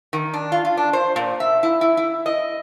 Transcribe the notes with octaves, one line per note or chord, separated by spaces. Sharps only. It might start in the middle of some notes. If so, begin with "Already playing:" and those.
D#3
D4
F4
F4
D4
C5
A#2
E5
E4
E4
E4
D#5